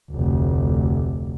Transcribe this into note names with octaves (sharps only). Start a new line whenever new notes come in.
F1 D2